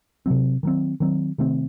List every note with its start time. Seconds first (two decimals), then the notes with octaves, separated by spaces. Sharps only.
0.26 C3 F#3 C4
0.63 D#3 F#3 C4
1.00 D#3 F#3 C4
1.38 C3 D#3 A3 C4